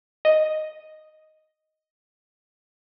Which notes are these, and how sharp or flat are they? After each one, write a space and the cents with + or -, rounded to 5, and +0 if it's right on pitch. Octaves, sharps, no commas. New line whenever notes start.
D#5 +0